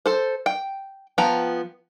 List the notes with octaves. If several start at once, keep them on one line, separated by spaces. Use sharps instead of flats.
A4 C5
G5
F3 B3 G5 A#5